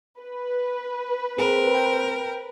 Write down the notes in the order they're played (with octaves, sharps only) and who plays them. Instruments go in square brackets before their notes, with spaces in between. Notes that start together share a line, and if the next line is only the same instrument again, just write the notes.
[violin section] B4
[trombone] C4 [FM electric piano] G#4 [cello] A#4
[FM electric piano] G5 G6